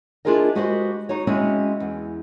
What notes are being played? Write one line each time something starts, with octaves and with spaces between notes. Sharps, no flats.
D4 E4 F4 G#4 A#4 D#5
G#3 F#4 G4 B4 C5 D#5
D#4 F#4 C#5
G#3 C4 C#4 E4 F#4
E2